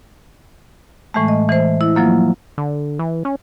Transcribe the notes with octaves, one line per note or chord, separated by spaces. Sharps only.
A2 E3 G#3 A3
D#5
E3 C5
E4
F3 F#3 A#3 F4
D3
E3
C#4